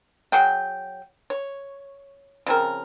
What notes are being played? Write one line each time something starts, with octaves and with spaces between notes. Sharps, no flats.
F#3 F#4 G#4 G5
C#5
C#3 F3 C4 A#4